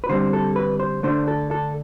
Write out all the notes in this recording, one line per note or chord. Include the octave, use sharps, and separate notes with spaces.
B4
D3 G3 C4 C5
A4
B4
C5
D3 A3 D4 C5
A4
A4